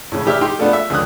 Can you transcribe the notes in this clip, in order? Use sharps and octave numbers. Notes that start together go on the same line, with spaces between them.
A2 C#3
E3 G4 E5 F6
D#4 G4 G5 C6
A3 B3 D4 F4 A4
E5
C#2 D3 F3 D#6 F#6